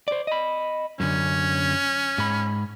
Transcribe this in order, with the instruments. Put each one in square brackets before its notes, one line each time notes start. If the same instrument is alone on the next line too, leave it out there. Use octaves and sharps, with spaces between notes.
[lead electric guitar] C5 D5
D#5 B5
[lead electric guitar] F#2 D3 [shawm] C#4
[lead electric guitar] G#2 B5